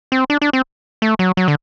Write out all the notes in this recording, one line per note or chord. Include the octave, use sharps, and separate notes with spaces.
C4
D4
D4
C4
A3
F#3
F#3
D3